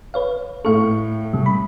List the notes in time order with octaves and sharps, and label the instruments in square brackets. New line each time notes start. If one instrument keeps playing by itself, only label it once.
[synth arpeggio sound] B4 C#5 F5
[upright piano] A2 C#6 [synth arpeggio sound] A4 F5
[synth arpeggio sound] C3 G3
B5